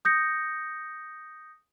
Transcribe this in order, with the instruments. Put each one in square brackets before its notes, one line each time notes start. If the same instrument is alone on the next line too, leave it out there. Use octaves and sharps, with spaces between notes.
[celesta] D#6 G6 A#6 C#7